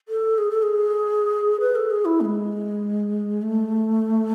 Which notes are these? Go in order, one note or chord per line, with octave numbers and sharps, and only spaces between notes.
A4
G#4
A4
G#4
B4
A4
G#4
E4
A3
G#3
A3